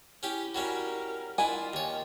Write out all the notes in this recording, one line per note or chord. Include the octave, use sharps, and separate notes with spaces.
C#4 E4 G4
F#3 G3 C#4 A#4
D4 E4 F4 D#5 G#5
D#2 C#5